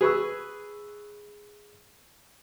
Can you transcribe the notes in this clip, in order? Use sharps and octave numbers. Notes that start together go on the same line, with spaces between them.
G#4 B4 C#6 E6